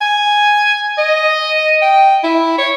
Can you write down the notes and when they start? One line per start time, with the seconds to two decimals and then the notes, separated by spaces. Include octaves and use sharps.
0.01 G#5
0.98 D#5
1.82 G5
2.24 E4
2.58 C#5